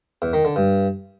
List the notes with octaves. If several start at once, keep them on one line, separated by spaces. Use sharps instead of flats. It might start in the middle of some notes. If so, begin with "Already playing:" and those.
E2
D#3
D3
G2